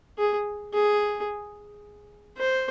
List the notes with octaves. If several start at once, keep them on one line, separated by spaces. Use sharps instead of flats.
G#4
G#4
C5